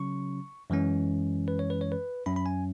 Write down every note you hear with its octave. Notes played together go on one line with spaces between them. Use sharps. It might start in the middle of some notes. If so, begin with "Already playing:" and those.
Already playing: C#3 F#3 C#4 C#6
F#2 E3 G#3 C#4
B4
C#5
B4
C#5
B4
F#2 F#3 C#4 B5
B5
G#5